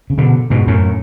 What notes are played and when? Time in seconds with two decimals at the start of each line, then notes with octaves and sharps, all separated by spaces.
0.10 C#3
0.18 B2 D3
0.50 G#2 B2
0.67 F#2 A2